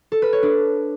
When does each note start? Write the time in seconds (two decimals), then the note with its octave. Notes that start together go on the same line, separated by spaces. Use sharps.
0.12 A4
0.22 B4
0.33 C#5
0.43 D4